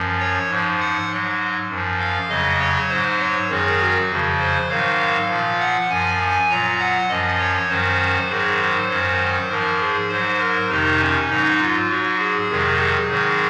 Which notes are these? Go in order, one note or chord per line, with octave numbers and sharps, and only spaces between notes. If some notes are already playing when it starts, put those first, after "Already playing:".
Already playing: F#2 F3
C#5
G#2 F3
F#5
G#2 F#3
F#2 F3
F5
F2 C#3 F#3 D#5
C#5
G#2 F#3 C5
C#5
F#2 D#3 F#3 G#4
F#4
F2 C#3 F3
C5
G#2 D#3 F#3 F5
A#2 F3
F#5
F#2 F3 G#5
A#2 F#3 A#5
F#5
F#2 F3 D#5
C#5
F#2 D#3 F#3 C5
G#2 D#3 F#3 G#4
C5
F#2 D#3 F#3
G#2 F3 A#4
G#4
G#2 F#3 C5
A#4
F2 C3 D#3 D#4
C#4
G#2 F#3 D#4
F4
G#2 F#3 F#4
G#4
F2 C3 D#3 F#3
G#4
G#2 D#3 F#3